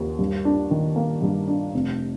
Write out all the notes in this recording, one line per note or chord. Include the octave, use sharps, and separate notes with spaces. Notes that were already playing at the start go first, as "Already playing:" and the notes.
Already playing: D#2
G2
D4
D#3
A#3
G2
D4
F1